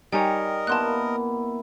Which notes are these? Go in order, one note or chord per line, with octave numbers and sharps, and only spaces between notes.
G3 D#4 A#4 C#5 D#5 G5 G#5
A#3 B3 E4 A5 C6 F#6